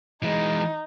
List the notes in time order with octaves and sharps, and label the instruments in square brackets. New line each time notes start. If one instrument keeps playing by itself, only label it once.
[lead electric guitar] E3 G#3 [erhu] D#4